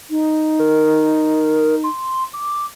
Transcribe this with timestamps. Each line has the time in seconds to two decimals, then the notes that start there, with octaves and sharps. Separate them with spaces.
0.10 D#4
0.59 A#4
1.84 C6
2.33 D6